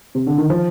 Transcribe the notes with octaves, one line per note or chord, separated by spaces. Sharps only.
C3
D3
D#3
F3